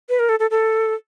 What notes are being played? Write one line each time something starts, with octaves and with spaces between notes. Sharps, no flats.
B4
A#4
A4
A4
A4